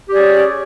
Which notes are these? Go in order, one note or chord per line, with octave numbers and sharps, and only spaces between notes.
C#4 G4 G#4 D5